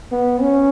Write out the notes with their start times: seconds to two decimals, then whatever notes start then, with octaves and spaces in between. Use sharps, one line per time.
0.12 B3
0.41 C#4